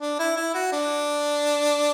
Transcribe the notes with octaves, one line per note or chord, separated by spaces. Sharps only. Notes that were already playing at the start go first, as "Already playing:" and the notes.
D4
E4
E4
F#4
D4